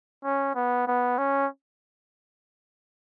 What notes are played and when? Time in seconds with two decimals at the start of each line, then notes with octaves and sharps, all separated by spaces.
0.24 C#4
0.55 B3
0.87 B3
1.18 C#4